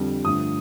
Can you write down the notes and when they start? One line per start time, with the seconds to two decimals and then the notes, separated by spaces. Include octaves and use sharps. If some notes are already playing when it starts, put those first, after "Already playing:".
Already playing: F2 D3 G3
0.25 G2 D3 F3 A3 D#6